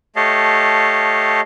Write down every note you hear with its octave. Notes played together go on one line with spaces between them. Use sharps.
A3 G4 C#5 D#5 F5 A5